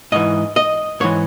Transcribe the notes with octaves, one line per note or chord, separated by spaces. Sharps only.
G#2 E3 D#5
D#5
G#2 E3 C#5